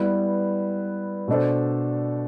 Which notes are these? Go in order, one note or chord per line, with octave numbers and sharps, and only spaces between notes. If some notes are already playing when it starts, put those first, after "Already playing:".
Already playing: G3 B3 E4 B4
B2 A3 D4 A4 C5